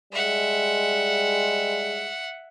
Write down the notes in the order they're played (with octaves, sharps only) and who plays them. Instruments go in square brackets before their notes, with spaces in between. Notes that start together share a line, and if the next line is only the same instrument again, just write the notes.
[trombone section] G3 G#3 [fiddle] E5 F#5